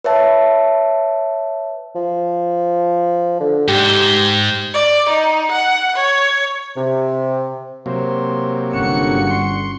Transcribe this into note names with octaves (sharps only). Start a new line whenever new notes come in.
B4 C#5 E5 A5
F3
D3
G#2 G4
D5
D#4
F#5
C#5
C3
C3 F#3 A#3 C5
G1 C#4 F#4 C#7
C6